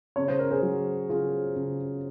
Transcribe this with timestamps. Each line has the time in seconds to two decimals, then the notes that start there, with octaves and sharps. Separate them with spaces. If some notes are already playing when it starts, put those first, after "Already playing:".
0.16 C#3 C#5
0.28 C5
0.39 A#4
0.51 G#4 C5
0.62 F#3
1.09 C#3 F4 G#4
1.56 C#3